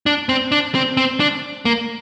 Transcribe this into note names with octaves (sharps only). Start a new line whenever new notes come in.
D4
C4
D4
C4
C4
D4
A#3